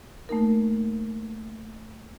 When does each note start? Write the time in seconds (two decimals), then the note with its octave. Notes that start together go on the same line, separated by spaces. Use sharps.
0.29 A3 A#3 D#4 A#4